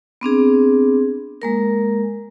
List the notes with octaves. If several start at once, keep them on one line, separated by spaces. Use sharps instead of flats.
B3 C4 D4 G#4
G#3 A#3 A#4